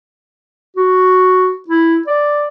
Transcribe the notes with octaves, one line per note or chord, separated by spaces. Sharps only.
F#4
E4
D5